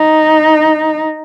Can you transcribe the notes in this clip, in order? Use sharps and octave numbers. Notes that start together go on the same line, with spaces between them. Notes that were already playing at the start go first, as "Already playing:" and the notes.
Already playing: D#4